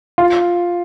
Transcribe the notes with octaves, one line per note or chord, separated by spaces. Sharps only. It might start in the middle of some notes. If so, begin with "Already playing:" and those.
F4